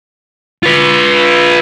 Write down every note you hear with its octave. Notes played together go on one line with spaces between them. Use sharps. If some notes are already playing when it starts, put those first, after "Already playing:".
F4 B4